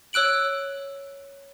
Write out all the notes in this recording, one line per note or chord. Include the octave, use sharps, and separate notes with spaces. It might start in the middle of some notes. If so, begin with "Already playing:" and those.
C#5 E6 F#6 D7 F#7